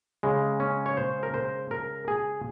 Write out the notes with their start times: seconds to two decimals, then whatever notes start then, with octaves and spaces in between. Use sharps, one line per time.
0.23 C#3 G#3
0.60 C#4
0.86 C#5
0.97 C5
1.23 A#4
1.34 C5
1.71 A#4
2.08 G#4